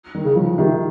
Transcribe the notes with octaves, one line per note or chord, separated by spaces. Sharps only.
D#3
C#3
F3
C3 D#3